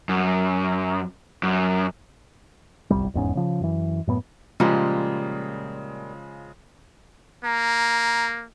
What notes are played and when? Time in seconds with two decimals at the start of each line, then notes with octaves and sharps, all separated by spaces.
0.09 F#2
1.43 F#2
2.90 D1 G1 C2 G3
3.14 F1 E2 G#2 C#4
3.35 C#3 F3
3.61 F#2 E3
4.07 F#2 A2 B3
4.60 A#2 C#3 F3 G3 G#3
7.44 A#3 A#5